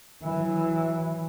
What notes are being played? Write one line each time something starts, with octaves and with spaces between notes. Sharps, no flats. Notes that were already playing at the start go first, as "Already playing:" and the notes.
E3 F#3